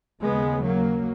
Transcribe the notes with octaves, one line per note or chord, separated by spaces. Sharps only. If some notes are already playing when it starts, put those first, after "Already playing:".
D#2 C#3 G#3 B3
F#3 A#3